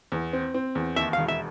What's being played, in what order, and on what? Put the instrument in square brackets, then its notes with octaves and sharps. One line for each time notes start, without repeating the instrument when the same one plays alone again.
[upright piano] E2
C4
C4
E2
[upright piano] D#2 [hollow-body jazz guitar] E5
[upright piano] E1 [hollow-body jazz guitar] F5
[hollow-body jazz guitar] E5